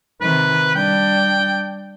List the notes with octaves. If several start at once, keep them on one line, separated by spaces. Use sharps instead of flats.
C3 D#3 B4
G3 D4 G5